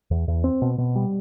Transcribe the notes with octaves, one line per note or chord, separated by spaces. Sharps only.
E2
E2
C4
B2
B2
G3